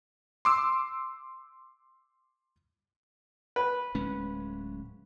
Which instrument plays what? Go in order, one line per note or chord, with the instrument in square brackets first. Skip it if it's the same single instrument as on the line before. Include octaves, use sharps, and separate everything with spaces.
[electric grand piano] C6 D6 E6
[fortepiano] B4
[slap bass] D1 G#3 C#4